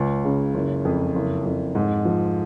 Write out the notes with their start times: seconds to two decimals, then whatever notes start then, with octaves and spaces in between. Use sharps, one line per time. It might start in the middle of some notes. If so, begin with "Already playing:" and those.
Already playing: C#2
0.25 C#3
0.54 F#1
0.85 F2
1.15 F#1
1.46 F2
1.75 G#2
2.05 F3